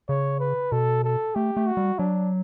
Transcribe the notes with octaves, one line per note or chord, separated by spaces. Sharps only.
C#3 C#5
B4
B2 A4
A4
A3 G4
A3
F#4
G3
F#3 D4